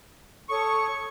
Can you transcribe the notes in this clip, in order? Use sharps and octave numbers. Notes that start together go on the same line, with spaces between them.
A4 C#5 C#6 D#6